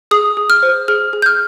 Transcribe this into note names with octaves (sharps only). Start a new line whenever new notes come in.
G#4 D#6
G#4
F6
C5
G#4 F6
G#4
G6
F6